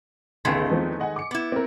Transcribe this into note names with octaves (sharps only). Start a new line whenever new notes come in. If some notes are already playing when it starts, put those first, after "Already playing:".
G1 C#2 D#3 G#3 A3 B6
E2 F3 C4
D#5 F#5 G#5
D6 C#7
B3 E4
C4 A#4